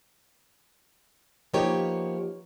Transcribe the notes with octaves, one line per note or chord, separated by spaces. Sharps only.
F3 A#3 B3 D#4 G4 C#5